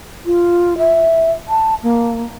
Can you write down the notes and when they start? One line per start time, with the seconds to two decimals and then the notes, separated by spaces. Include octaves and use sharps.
0.26 F4
0.78 E5
1.48 A5
1.83 A#3